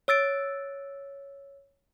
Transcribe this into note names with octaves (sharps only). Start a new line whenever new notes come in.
C#5 E6 A6 D7